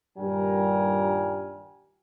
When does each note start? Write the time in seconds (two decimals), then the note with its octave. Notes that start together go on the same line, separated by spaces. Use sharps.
0.18 G2 A#2 D#3 G3 A#4 G#5